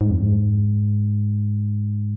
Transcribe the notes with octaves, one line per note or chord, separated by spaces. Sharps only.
G#2
F2
G#2